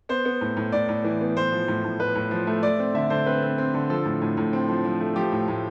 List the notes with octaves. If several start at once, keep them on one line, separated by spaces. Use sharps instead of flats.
B3 C5
B3
A2
A2
A2 D5
A2
E3
B3
A2 C5
F3
A2
A2
A2 B4
A2
F3
A3
A3 D5
C4
D3 E5
D3 C5
C4 B4
C4
C4
D3
F3 A4
A2
A2
A2
C4
F3
F3
A3
F3 G4
A2
A2